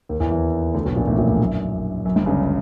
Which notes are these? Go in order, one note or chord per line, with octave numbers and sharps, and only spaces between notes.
D#2 D#3
E2 E3
E2 E3
D2 D3
B1 B2
A#1 A#2
A1 A2
A#1 A#2
A1 A2
F#2
F#2
G1 G2
C#2 C#3